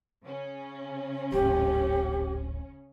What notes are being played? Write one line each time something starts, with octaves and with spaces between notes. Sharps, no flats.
C#3 C#4
D1 G#1 G4